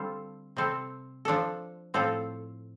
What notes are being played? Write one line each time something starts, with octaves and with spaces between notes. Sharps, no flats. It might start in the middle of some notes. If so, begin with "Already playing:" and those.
Already playing: D3 G3 C4 F4 A4
C3 G3 C4 A4
F3 D4 A4
A2 F3 C4 F4 A4